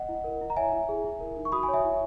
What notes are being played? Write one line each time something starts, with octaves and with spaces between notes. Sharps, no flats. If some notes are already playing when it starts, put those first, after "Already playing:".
Already playing: D#5 F#5
E4
A#4
E4
A#5
C#5 E5 G#5
E4
G#4
E4
A#4
D#4
C#6
F#4 B5 D#6
G#5 B5
C#5
E5 G#5
E4